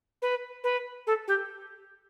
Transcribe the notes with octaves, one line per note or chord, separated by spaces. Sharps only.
B4
B4
A4
G4